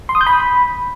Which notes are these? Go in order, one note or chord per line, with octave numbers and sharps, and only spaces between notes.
C6
D#6
G6
B5